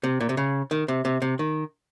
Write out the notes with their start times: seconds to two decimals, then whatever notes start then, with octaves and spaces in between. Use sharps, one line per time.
0.03 C3
0.20 A#2
0.29 C3
0.37 C#3
0.71 D#3
0.88 C3
1.05 C3
1.22 C3
1.39 D#3